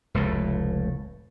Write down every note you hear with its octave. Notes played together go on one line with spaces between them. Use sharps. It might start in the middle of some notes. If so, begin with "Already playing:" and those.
F1 C#2 A2